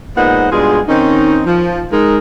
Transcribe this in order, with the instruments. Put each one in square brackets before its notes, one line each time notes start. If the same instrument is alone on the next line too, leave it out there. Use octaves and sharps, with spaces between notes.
[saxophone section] A#2 G#3 B3 D#4 C5 F#5
G2 B2 G#3 F4 G#4
D#3 C4 C#4 D#4
F3
G#3 D#4 A#4